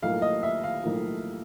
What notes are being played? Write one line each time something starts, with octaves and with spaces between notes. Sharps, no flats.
B1 A2 F3 A#3 F5
D#5
E5
F5
B1 A2 F3 A#3